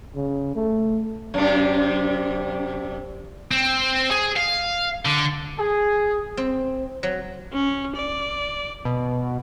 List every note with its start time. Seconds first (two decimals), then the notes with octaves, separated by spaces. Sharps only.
0.15 C#3
0.55 A3
1.34 F#2 C3 D4
3.51 C4
4.11 G#4
4.36 F5
5.05 D3
5.58 G#4
6.37 C4
7.03 F#3
7.53 C#4
7.96 D5
8.85 B2